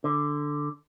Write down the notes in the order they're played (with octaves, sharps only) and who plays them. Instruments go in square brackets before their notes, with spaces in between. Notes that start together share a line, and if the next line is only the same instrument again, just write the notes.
[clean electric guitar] D3